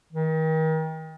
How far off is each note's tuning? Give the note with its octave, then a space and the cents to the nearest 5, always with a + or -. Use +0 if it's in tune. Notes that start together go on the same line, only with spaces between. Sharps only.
D#3 +35